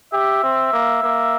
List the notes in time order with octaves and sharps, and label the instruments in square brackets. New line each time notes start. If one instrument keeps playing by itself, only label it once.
[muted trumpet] G4 [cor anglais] E5
[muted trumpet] C4
A#3
A#3